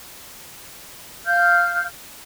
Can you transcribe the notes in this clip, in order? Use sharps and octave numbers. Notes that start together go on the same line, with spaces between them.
F5 F6 G6